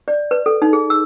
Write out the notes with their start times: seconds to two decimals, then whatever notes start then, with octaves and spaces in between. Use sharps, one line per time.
0.08 D5
0.31 B4
0.46 A4
0.62 D#4
0.73 G#4
0.90 E6